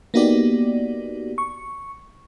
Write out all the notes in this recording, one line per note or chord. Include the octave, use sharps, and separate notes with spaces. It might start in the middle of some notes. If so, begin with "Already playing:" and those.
A#3 B3 D#4 F#4 G4 D5
C#6